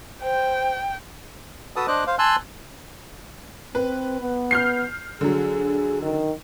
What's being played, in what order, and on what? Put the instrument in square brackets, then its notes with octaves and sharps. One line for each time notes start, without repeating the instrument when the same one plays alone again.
[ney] C5 [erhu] G5
[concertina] F#4 A4 B4 A5 D#6
D4 C5 D#5 D6 F#6
C5 F5
G#5 A5 C6 E6 F#6
[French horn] C4 [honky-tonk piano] B4
[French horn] B3
[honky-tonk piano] F6 G6 C7
[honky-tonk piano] D3 F#3 [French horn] G#4
[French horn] D#3